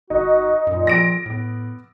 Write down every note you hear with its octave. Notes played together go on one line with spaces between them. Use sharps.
G1 D#4 F#4
F#2 A#2
F3 A#6 D7
A2 B3